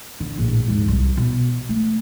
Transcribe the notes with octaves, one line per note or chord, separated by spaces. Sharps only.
D3
A#1 A2
D#2 G#2
C2
B2
A3